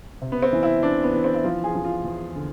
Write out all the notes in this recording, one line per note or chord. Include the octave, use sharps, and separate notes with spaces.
C3
B3
C4
E3
E4
E3 D4
B3
E3
C4
E4
F3 F4
G#4
F3
F4
E2
D3